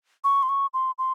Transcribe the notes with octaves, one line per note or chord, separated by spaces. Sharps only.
C#6
C6
C#6
C6
C6